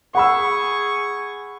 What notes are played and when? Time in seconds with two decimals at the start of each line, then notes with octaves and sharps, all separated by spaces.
0.15 G#4 F#5 B5 C#6 E6